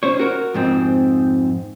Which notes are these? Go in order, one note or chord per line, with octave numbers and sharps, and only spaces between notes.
C#4 C5 C#5
F#4 A#4
F2 G#2 C4